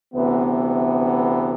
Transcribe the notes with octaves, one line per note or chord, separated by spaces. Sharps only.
D2 C3 E3 B3